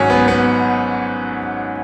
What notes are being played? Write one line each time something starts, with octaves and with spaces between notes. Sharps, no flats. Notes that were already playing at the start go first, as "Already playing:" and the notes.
Already playing: G#1 G#2 F#3 C#4
B3
B3